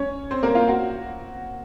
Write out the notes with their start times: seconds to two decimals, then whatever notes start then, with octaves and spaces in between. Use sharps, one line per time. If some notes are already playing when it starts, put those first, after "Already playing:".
Already playing: C#4 C#5
0.31 C4 C5
0.43 A#3 A#4
0.55 F4 F5
0.68 F#4